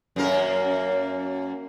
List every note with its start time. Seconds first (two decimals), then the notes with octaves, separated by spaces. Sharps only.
0.16 F#2 A#3 A#4